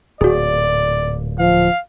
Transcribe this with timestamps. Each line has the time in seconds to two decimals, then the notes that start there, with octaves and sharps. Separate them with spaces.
0.21 D1 A#2 F#4 G#4 D5
1.39 F3 F5